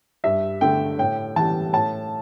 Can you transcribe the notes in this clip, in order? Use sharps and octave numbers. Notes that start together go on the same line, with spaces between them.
G2 E5
D3 A3 G5
A2 G5
E3 G3 A5
A2 A5